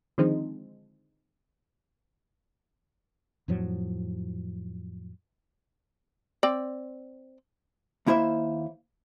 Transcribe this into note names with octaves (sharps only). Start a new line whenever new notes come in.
D3 D#3 F3 G#3 C4 D#4
F2 A2 F3 F#3
C4 D5
D#2 A#3 E4 C5 E5